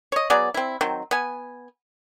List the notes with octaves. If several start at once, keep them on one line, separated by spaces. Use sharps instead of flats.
C#5 D#5
F#3 B3 G#4 D5
C4 E4
D#3 F#3 C4
B3 G#5